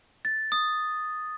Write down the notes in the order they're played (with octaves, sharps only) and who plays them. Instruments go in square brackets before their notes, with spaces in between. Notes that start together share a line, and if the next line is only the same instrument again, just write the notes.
[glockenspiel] A6
D#6